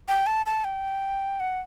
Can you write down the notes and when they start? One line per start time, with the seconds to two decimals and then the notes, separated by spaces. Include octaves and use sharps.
0.08 G5
0.27 A5
0.46 A5
0.64 G5
1.40 F#5